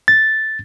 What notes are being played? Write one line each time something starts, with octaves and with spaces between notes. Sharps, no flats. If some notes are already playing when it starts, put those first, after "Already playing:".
A6